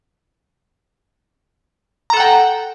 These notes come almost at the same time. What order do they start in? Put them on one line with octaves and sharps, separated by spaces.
A#5 A4 F#5 G5